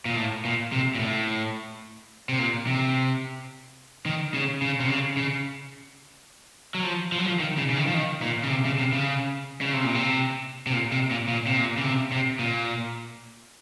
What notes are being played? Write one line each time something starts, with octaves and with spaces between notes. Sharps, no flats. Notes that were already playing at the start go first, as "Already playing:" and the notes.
A#2
A2
A#2
C3
A#2
A2
C3
A#2
C3
D#3
C#3
C#3
C3
C#3
C#3
F#3
F3
F3
F#3
F3
D#3
C#3
C#3
D#3
F3
D#3
A#2
C#3
C3
C#3
C3
C#3
C#3
C3
A#2
C3
C3
A#2
C3
A#2
A#2
C3
A#2
C#3
C3
C3
A#2